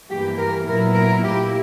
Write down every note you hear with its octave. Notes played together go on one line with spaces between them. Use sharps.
G2 E3 A#3 G4
A#4
A#2 F#3 B3 E4 A#4
A#4
A#2 A#3 E4 G4